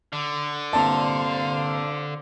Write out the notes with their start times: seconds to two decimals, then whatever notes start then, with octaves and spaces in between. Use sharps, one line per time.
0.13 D3
0.73 C2 G2 A#2 C5 F5 A5